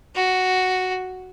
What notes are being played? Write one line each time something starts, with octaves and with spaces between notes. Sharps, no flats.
F#4